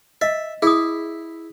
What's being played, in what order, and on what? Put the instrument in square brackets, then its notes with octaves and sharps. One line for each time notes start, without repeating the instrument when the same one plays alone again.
[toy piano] D#5 [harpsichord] E5
[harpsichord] E4 [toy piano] G#4 D#6